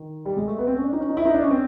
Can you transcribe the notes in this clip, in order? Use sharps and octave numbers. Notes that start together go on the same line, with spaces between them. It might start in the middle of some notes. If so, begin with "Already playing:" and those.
Already playing: D#3
G3
G#3
A3
B3
C4
C#4
D4
D#4
C#4
D#4
E4
D#4
D4
C#4
C4